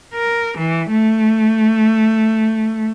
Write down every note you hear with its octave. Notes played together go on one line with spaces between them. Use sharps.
A#4
E3
A3